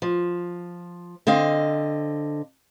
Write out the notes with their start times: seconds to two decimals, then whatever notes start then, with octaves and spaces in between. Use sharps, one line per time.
0.02 F3
1.27 D3 C4 D#5 F5